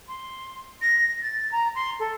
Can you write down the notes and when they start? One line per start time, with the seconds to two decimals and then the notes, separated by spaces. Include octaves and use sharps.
0.08 C6
0.81 A#6
1.22 A6
1.51 A#5
1.75 C6
1.99 A4